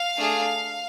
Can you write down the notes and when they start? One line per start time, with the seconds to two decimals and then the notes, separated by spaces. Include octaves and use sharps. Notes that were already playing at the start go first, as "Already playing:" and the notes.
Already playing: F5
0.17 A3 D4 G#4